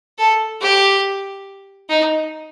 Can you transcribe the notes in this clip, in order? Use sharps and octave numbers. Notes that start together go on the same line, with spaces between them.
A4
G4
D#4